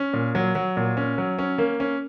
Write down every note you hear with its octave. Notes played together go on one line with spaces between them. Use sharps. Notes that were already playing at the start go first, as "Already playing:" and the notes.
Already playing: C#4
A#2
F#3
F#3
A#2
C#4
F#3
C#4
A#3
C#4